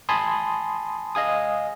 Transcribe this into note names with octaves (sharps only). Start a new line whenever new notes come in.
G#5 A5 B5 C6 D#6
D#5 F5 G#5 D#6